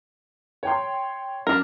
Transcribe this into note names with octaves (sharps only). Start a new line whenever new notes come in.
C#5 G5 C6
F#2 D4 A#4